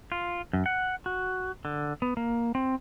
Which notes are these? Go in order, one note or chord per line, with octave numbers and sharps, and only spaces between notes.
F4
F#2
F#5
F#4
D3
B3
A#3
C4